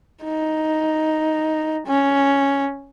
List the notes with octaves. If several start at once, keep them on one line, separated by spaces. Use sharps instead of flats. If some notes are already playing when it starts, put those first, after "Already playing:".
D#4
C#4